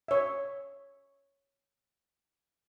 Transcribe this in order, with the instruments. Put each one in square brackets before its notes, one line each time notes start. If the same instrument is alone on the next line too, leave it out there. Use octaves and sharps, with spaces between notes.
[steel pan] C#5 E5